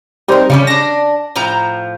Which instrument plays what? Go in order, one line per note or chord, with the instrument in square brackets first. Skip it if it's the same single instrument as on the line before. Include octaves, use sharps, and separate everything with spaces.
[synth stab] G3 C4 [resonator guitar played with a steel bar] D#4 A#4
[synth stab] C#3 [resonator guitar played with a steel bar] F3 G3 C#4
[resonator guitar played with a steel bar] D4 A5 [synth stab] A#6
[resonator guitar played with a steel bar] A2 F3 A#5